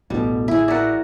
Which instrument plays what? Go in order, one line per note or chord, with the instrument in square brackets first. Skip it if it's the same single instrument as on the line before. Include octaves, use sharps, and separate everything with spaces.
[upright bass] A1 [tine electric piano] D2 B2 D3 [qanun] G3
[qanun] E4 G#4
[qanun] F#4 A#4 [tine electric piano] D5 E5 F#5